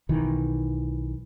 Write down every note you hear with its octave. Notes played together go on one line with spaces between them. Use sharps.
B1 D#3 E3